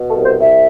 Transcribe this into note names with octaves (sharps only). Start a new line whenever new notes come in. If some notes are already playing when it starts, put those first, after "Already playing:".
Already playing: B2
A4
C2
C5
C2 E5